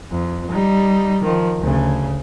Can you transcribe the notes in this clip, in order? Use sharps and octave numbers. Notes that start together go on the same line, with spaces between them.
F2
G3 D#4
D#3 F3
D2 C#3